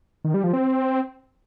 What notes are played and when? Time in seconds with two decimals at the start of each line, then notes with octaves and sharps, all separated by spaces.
0.25 D#3
0.34 G3
0.44 F3
0.53 C4